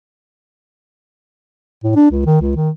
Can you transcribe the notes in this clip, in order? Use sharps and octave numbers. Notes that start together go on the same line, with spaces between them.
A2
D4
C#2
D#3
C#2
D#3